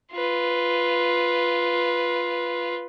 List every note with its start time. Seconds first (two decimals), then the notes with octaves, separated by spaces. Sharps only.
0.13 F4 B4